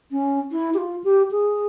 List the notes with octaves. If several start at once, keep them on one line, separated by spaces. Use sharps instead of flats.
C#4
E4
G4
F4
G4
G#4